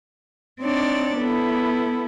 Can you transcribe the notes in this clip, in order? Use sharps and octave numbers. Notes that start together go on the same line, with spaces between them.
C4 D4 D#4 C#5 D5
B3 E4 A4